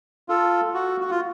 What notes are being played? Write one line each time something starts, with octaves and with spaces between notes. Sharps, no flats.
F4 A4
F#4
F#4
F4